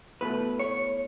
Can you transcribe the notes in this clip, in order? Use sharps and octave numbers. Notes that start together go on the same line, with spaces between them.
B2 A3 E4 B4
C#5